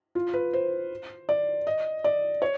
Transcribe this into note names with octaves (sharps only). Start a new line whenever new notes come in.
F4
B4
C5
D5
D#5
D5
C#5